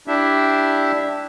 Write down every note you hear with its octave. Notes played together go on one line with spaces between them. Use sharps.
D4 E4 G4 E5